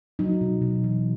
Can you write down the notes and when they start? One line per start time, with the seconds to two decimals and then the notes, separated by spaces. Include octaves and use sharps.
0.19 F#3 D#4
0.41 B2
0.62 B2
0.84 E3